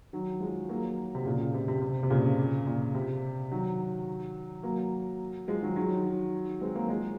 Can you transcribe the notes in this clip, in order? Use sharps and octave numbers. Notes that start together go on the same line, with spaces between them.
D#3 F#3
F3 G#3
F#3 A#3
C3
A#2 C#3
A#2
C3
C3
C3
C3
A#2 C#3
A#2
C3
D#3 F#3
F#3 A#3
F3 G#3
D#3 F#3
D#3 F#3
G#3 C4
F#3 A#3
F3 G#3